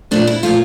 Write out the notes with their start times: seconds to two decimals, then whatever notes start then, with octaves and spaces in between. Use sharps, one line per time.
0.11 A#2 F3 A3 D4
0.27 E4
0.43 A#2 F3 A3 F4